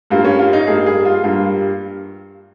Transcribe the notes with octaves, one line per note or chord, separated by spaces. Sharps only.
G2 G3 A#3 F4
C#4
F4
D#4
G2 G3 A#3 G#4
G#4
F4
G2 G3 A#3 F4